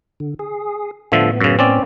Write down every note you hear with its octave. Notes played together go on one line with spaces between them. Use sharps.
D3
G#4
A2 D3 F3 B3 E5
F#2 C#3
C4 C#4 D5